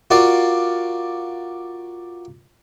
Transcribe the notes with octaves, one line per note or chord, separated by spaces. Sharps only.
F4 F#4 A#4 D5 F5